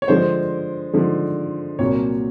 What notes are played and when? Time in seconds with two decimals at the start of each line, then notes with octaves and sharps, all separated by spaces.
0.02 C#5
0.08 D3 F3 G#3 C5
0.93 D3 F3 G#3
1.79 C2 A#2 F#3 A#3 C#5